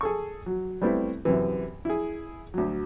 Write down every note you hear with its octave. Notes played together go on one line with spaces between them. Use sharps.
G#4 A4 C#6
F#3
G3 A3 B3 C4 E4
F#2 C3 E3
E4 G#4
D2 F#3